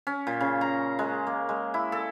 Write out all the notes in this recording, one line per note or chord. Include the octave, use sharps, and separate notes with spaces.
C#4
A#2
C#3
A#5
G#3
A#3
G#3
E4
A4